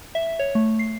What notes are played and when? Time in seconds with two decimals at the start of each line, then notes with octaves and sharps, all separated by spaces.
0.15 E5
0.39 C#5
0.55 A3
0.79 C7